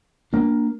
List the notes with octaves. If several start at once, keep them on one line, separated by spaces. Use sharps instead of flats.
A#3 D4